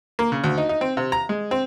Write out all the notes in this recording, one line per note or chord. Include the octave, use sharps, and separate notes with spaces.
A#3
C#3
D2
D#4
D#4
C4
C3
A#5
G#3
C4